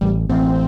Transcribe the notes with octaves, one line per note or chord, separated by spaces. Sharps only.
A1 G3
A1 C4